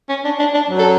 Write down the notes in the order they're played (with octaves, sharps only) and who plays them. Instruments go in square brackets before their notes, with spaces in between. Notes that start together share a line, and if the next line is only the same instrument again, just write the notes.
[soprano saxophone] C#4
D4
D4
D4
[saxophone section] F#2 F#3
[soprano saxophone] A4